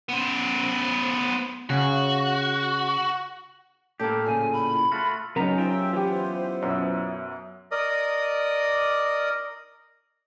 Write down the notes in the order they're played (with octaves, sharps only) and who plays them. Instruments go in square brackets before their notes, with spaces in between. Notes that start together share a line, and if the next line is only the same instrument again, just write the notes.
[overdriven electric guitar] B3 C5
[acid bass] C#3 [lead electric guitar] F#4
[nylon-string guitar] A2 A4 [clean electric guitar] A#3 G4
[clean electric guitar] A#2 C#3 [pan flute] G#5
[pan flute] B5
[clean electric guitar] A3 F4 F#4
[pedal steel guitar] C#3 B3 A#5 [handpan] F#3 C#4 [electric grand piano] D#4 A#4
[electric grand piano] F4 [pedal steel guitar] G4 E5 G5 [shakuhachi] C5
[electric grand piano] E3 G4 [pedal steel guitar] B3 E4 F4
[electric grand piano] F#2 B2 [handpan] E5
[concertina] A#4 D5 D#5 D#6